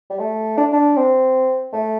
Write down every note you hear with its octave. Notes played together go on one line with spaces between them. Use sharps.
G3
A3
D4
D4
C4
A3